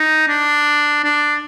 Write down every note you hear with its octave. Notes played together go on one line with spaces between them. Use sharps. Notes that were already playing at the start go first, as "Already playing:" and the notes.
Already playing: D#4
D4
D4